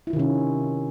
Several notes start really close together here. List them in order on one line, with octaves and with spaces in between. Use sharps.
E4 F4 D#3 C3 C#4